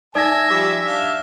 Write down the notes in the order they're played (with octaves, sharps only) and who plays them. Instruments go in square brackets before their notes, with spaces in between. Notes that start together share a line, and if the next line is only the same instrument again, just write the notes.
[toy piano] D#4 A4 [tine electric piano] D5 G#6 A#6 [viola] E5 [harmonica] G#5 A5
[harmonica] F3 G3 D6 [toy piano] G4
[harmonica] D4 E5 F5